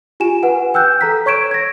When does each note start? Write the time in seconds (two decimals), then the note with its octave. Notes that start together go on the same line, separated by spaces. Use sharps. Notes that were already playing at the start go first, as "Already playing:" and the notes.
0.20 F4 G4 G#5 E7
0.43 B4 F#5 G#5
0.74 G5 E6 F#6 G6
1.01 A4 A#5 B6
1.26 C#5 C#6 G#6 D7 E7
1.51 G#6 A#6